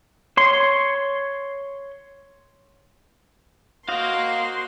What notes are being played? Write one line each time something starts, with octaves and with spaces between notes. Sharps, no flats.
C#5 C6
A#3 F#4 C5 D#5 F5 C6